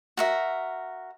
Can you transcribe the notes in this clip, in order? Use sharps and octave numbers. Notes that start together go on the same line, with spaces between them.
F#4 A#4 E5